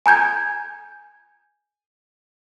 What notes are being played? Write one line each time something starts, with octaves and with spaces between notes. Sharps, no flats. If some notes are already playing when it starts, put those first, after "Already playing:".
G#5 A#5 G6 G#6